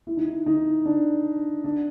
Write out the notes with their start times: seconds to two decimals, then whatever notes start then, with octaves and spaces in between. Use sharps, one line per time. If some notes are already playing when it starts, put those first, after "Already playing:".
0.07 E4
0.17 D#4
0.29 E4
0.46 D#4
0.85 D4
1.64 D4